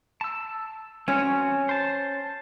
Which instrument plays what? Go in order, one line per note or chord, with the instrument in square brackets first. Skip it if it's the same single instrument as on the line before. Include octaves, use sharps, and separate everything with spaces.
[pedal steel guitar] A5 E6
[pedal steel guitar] E3 C4 F#4 [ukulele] C#4
[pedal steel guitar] C5 A5